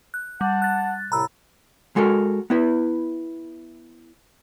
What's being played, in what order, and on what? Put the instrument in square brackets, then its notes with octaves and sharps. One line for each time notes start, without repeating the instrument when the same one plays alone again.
[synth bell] F#6
[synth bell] G3 [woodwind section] F#5 A5
[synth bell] F#6 A6
[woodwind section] C2 A2 C3 [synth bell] A#5 B5 E6
[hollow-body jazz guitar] G#3 F#4 A4 A#4
B3 E4 B4